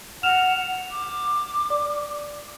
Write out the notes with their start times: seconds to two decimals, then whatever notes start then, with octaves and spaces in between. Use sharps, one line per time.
0.23 F#5 F6 E7 F7
0.91 D6
1.70 D5